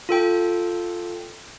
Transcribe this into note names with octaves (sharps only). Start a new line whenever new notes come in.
F4 A4 G5